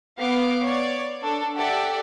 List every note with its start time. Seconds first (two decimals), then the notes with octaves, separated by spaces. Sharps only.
0.17 B3 F5 D6
0.64 C#5 D5
1.22 D4 A4
1.57 G4 A4 D5 E5 F#5